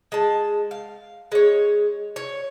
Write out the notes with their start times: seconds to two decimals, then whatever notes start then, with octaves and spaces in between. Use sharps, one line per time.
0.12 G#3 A5
0.71 F5
1.32 G#3 C#5
2.16 C#5